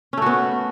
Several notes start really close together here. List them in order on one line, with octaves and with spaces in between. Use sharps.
C#4 A3 F#4 B3